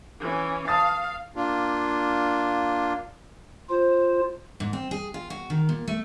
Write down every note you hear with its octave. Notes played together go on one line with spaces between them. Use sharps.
E3 C#4
F5 A5 D#6 A6
A#3 D4 F4
F4 C5
G#2
C4
G#4
F4
F#4
D#3
A#2
A3